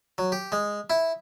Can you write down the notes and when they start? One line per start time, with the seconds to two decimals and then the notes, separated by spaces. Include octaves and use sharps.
0.18 F#3
0.32 G4
0.52 G#3
0.90 E4